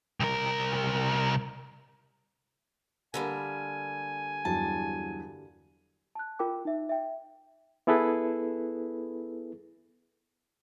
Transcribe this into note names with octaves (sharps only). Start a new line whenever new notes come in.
C2 A#4
D3 G3 A#3 G#5
E2 G2 F#3 A5
A5 F#6
F4 A#4 G5 D6
D#4 E5
E5 G5
B3 E4 G#4 A4 B4